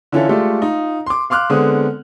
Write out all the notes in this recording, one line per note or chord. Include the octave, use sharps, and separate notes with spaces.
D3 E3 C#4 E4 F4 A4
G#3 A3 F4 G4 A4 D5
D#4 F4
C6 D6
F5 C6 D6 F6 F#6
D3 G#3 B3 C4 D#6